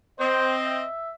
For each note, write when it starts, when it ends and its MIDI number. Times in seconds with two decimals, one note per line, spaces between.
0.20 0.83 60
0.20 0.58 72
0.20 0.87 75
0.67 1.13 76